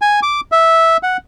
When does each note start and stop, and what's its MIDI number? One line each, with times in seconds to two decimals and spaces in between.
0.02 0.20 80
0.23 0.41 86
0.52 0.97 76
1.03 1.17 78